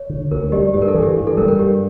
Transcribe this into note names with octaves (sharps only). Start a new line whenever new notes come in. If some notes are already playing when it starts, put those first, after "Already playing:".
Already playing: C#5
D3
D2 A#4
G3 G4
G2 G4
A#4
A4
E3
G4
G2
A4
G3 A#4
A#4
G2 G4